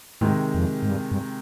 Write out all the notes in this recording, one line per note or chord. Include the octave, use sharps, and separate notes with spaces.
G#2 C3 D#3 G#3
F2
G#2
G2
G2